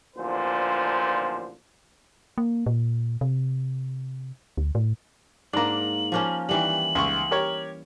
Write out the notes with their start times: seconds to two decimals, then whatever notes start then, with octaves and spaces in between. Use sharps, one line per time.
0.17 A1 A#2 D3 F3 C5
2.38 A#3
2.66 A#2
3.21 C3
4.57 D2
4.75 A2
5.53 G#2 A#3 D4 A#5 F#7
6.12 F3 A#3 C#4
6.49 D#3 E3 G3 F#7
6.95 C#2 E5 C#6
7.31 G4 A#4 C#5